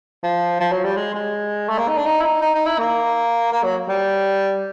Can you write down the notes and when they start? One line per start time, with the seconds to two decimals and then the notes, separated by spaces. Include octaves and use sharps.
0.23 F3
0.60 F3
0.72 F#3
0.84 G3
0.96 G#3
1.14 G#3
1.69 A3
1.78 A#3
1.88 D#4
1.97 D4
2.05 D#4
2.20 E4
2.23 D#4
2.41 D#4
2.55 D#4
2.66 E4
2.79 A#3
3.52 A#3
3.63 F#3
3.89 G3